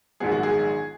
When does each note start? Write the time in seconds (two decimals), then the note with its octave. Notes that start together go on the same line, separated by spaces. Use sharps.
0.20 A#1 G#2 D#3 F#3 B3 G#4
0.32 F#4
0.43 G#4